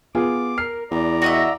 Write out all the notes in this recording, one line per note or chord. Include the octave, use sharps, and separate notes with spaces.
B3 F4 G#4 D6
A#4 F6 C7
E2 D5 A#5
F#4 D#5 E5